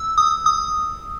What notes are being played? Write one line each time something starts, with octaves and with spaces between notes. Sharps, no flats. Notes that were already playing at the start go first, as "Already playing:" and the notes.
Already playing: E6
D#6
D#6